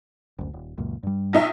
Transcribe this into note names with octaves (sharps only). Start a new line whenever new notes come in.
F#1 D2
D#1
C#2 F#2 A#2
G2 G3
A#1 D#4 E5